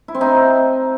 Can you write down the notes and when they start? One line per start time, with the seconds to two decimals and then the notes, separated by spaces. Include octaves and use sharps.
0.08 E4
0.15 C4
0.21 D#4